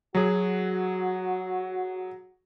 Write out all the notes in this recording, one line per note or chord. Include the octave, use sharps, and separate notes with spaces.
F#3 F#4 G#4